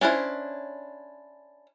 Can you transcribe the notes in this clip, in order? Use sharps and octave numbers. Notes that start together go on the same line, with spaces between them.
C#4 D4 E4 C5